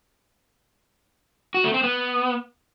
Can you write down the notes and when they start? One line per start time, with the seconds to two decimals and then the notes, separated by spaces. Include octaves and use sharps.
1.54 F#4
1.64 A3
1.74 C4
1.83 B3